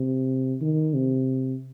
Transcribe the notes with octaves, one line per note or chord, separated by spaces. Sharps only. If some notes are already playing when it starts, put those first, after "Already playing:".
Already playing: C3
D#3
C3